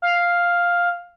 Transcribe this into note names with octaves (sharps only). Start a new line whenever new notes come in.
F5